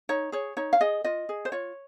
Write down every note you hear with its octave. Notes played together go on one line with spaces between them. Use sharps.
D#4 C#5
G#4 C#5
D#4 C#5
F5
G#4 D#5
F4 D#5
G#4
C5
F4 C#5